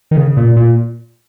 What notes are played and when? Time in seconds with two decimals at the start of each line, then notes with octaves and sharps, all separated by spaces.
0.11 D#3
0.17 C#3
0.37 A#2
0.57 A#2